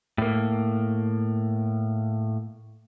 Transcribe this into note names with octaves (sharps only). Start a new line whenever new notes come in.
A2 A#3